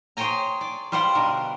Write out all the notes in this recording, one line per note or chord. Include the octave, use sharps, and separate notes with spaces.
G#4 C5 C#5 G5 G#5 A#5
D5
G3 F4 C5 F#5 G5
B2 D3 A#4